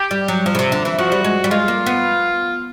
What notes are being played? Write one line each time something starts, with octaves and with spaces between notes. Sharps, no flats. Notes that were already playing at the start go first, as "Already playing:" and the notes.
Already playing: G4
G3
F#3
F3
C#3
C3
D3
E3
F3 F#4
G3
G#3
G3
G#3 F4
A#3
B3